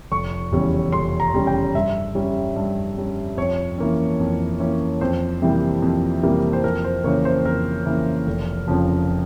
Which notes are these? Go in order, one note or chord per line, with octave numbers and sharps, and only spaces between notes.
F1 C#6
E2 C#3 G3 C#4
F1 C6
A#5
E2 C#3 G3 C#4
G5
G2 E5
G3 C#4
G2
G3 C#4
F2 C#5
E3 A#3 C#4
F2
E3 A#3 C#4
F2 C5
C3 E3 G3 A#3
F2
C3 E3 G3 A#3
C5
F2 A#4
C5
C#3 E3 A#3 C#5
C5
F2 A#4
C#3 E3 A#3
F1
F2 C#3 F3